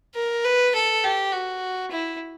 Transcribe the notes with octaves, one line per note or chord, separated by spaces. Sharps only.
A#4
B4
A4
G4
F#4
E4